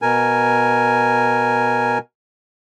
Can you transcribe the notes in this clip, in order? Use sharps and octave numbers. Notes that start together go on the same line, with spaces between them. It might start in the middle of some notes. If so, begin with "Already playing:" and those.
B2 A#4 G#5